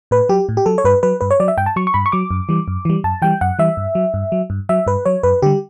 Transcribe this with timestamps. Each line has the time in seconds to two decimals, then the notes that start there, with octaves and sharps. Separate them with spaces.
0.11 A2 B4
0.29 F#3 G4
0.49 A2
0.57 G4
0.66 F#3 A4
0.78 C#5
0.85 G2 B4
1.03 F#3 B4
1.21 G2 B4
1.31 C#5
1.40 F#3 D5
1.48 E5
1.57 G2 G5
1.66 A5
1.76 F#3 C#6
1.87 C#6
1.94 G2 B5
2.06 C#6
2.12 F#3 D6
2.31 F#2
2.49 E3 G3
2.68 F#2
2.85 E3 G3
3.04 F#2 A5
3.22 E3 G3 G5
3.41 F#2 F#5
3.59 E3 G3 E5
3.77 G2
3.95 F#3
4.14 G2
4.32 F#3
4.50 G2
4.69 F#3 E5
4.87 G2 B4
5.06 F#3 C#5
5.23 F#2 B4
5.42 D3 G3 G4